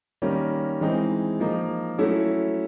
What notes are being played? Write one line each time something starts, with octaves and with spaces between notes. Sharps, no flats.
D#3 G3 A#3 C#4
E3 G#3 C4 D#4
F3 A#3 D#4
F#3 A3 C#4 E4